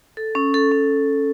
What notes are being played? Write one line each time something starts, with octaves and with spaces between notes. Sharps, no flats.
A4
C#4
A4
C#4